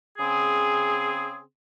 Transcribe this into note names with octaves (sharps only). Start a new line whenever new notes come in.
C#3 C4 G#4